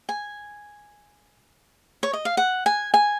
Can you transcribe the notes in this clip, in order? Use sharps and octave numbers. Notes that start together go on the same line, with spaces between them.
G#5
C#5
D#5
F5
F#5
G#5
G#5